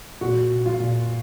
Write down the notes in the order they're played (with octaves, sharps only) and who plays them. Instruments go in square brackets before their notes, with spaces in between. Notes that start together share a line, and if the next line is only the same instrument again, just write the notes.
[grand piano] A#2 F#4
A#2
F4
A#2